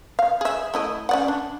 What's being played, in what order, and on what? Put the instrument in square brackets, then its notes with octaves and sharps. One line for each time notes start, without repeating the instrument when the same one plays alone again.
[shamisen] F5
G#4 E5
A3 E4 D#5
C#4 D5 F#5
D4